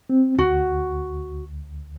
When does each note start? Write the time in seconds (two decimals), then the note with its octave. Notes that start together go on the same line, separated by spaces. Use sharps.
0.10 C4
0.38 D2 F#4